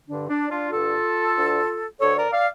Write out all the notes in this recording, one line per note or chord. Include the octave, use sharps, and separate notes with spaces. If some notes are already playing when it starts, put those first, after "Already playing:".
G2 D3 D4
D4
D4 F4
G2 D3 F4 A4
D2 D3
D2 D3 A4 C#5
A#4 D5
D5 F5